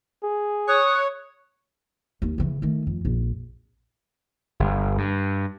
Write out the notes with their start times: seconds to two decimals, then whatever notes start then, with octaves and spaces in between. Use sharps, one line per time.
0.23 G#4
0.68 C#5 D#6 F#6
2.22 D#2 C#4
2.38 C#3 E3
2.62 D#3 A3
2.87 F2
3.05 A#1 F2
4.60 G1
4.98 G2